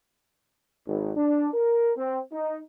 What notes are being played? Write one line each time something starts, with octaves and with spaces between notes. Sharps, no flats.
G#1
D4
A#4
C4
D#4